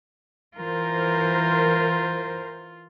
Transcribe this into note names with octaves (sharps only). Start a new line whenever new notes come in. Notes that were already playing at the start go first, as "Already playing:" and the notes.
E3 F4 A#4 C5